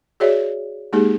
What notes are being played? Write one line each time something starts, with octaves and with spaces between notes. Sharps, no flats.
F#4 G#4 C#5 D5 E5
G#3 A#3 D#4 G4 G#4